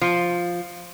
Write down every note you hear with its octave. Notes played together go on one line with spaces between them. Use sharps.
F3